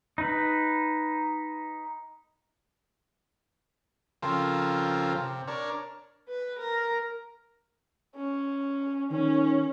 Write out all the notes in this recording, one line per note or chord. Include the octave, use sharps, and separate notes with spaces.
D#4 B4
C#3 F3 C4 F4 A4 A#4
C3
D4 A#4 C#5
B4
A#4
C#4
D#3 C#4